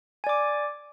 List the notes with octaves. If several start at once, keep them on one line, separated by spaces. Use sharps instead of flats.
D5 G#5 D6